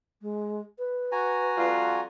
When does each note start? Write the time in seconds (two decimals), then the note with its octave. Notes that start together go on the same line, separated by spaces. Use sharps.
0.22 G#3
0.79 B4
1.12 F#4 G#5 A#5
1.57 F2 G3 F4